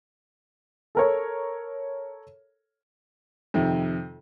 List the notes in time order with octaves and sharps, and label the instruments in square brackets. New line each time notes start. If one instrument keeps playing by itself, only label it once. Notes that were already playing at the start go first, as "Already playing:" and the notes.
[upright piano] A4 A#4 C#5
[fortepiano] F2 C3 D#3